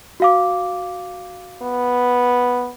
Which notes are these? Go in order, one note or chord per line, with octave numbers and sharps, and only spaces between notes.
F#4 F5 D6
B3